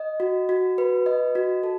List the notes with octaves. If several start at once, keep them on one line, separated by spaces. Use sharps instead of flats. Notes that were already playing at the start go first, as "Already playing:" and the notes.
Already playing: D#5
F#4
F#4
B4
D#5
F#4
A4